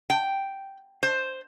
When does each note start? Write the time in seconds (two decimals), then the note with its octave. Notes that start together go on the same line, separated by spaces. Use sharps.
0.10 G5
1.03 C5